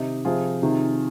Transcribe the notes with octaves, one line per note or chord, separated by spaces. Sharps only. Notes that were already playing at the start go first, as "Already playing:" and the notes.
Already playing: C3 D#3 D#4 G4
C3 F3 F4 G#4
C3 D#3